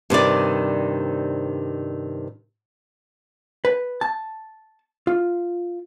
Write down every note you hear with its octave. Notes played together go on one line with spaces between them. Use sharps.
G2 C3 D#3 D5
B4
A5
F4